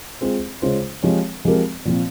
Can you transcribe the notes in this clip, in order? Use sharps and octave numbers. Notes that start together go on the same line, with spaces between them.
G#3 C4 F4 G#4 C5
C#3 G#3 C#4 F4 C5
F3 G#3 C4 G4 C#5
F3 G#3 C4 G4 A#4
A#2 F3 C4